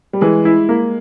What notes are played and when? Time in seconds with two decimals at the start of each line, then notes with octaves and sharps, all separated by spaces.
0.13 G3
0.21 E3 G#3
0.45 E4
0.69 A#3